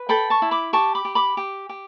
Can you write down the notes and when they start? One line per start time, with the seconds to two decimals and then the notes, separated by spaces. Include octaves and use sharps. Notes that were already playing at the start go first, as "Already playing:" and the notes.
Already playing: B4
0.09 A4 G5 B5
0.30 A5 C#6
0.42 E4
0.51 B5 D6
0.73 G4 A5 C#6
0.95 B5 D6
1.05 G4
1.15 B5 D6
1.37 G4
1.69 G4